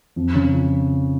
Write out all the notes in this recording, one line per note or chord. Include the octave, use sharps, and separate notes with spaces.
F2
C#3
F3